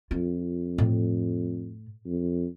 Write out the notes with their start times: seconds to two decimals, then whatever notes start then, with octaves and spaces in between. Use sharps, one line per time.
0.11 F2 F4
0.78 A2
2.06 F2